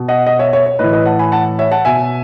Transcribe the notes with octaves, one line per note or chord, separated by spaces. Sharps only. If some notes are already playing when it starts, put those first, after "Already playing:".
Already playing: B2
D#5 F#5
D#5 F#5
C#5 E5
C#5 E5
C#5
A2 E3 B4 D#5
B4 D#5
F#5 A5
G#5 B5
F#5 A5
C#5 E5
F#5 A5
B2 E5 G#5